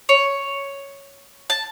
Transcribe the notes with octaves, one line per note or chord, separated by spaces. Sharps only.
C#5
A5